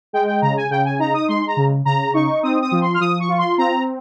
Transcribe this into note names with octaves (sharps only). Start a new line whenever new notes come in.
G#3 G5
G5
C#3 A#5
G#5
C#3 G5
G#5
D#4 A#5
D#6
G#3 C6
A#5
C#3
C#3 A#5
D#4 C#6
C4 D#6
D#6
F3
C6
F6
F3 D#6
C#6
F4
C6
C4 A#5